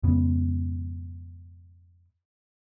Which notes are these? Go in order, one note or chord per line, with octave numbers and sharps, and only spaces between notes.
F2 G#2 C#3 B3